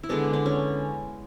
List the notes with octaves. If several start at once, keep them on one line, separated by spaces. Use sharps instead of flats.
E4
D3 G#3 B3 D4
D4
C#4